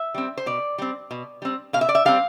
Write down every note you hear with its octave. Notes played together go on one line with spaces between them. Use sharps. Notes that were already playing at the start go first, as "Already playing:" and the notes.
Already playing: E5
G3 C4
C5
B2 D5
G3 C4
B2
G3 C4
B2 F5
E5
D5
E5
G3 C4 F5